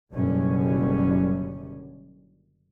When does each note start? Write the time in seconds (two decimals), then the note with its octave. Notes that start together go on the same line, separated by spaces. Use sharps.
0.12 F#1 F#2 B2 D3 G3 C#4